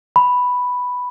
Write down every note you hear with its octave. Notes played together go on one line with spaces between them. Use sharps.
B5